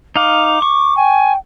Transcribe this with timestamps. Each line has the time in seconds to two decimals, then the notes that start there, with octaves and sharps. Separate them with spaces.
0.16 D#4 F5 D6
0.62 C#6
0.97 G5 G#5